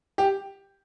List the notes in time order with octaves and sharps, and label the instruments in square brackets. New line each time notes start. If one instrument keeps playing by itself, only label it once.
[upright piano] G4